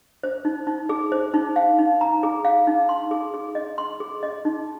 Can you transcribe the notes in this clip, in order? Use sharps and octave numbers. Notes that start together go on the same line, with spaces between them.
C5
D#4
D#4
G#4
C5
D#4
F5
D#4
A#5
G#4
F5
D#4
C6
G#4
G#4
D#5
C6
G#4
D#5
D#4